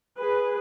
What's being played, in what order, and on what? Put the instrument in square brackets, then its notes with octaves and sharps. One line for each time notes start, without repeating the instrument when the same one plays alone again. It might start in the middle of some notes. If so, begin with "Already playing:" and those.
[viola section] G#4 B4